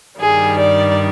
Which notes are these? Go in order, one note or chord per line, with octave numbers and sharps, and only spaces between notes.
G2 D#3 G3 G#4
D5